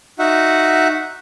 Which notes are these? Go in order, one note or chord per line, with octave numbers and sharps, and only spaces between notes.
D#4 F#4 E5 F#5